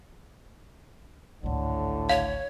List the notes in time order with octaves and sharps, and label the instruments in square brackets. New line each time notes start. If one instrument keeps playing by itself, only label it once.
[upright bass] G#1 C#2 [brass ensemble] A2 D3
[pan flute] C#5 [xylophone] F5